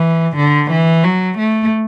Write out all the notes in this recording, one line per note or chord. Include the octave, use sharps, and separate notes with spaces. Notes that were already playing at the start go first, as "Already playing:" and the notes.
Already playing: E3
D3
E3
F#3
A3